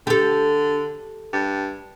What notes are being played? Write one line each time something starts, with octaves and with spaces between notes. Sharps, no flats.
D3 G4 A4
G2